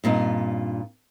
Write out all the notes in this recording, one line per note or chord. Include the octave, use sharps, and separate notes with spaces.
G2 A#2 C4 D#4